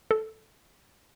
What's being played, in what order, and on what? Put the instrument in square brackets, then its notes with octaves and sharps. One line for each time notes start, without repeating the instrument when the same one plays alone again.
[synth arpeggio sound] A4